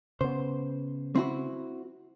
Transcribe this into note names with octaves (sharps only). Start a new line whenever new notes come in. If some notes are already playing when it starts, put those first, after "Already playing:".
C#3 B3 C5
C4 E4 F#4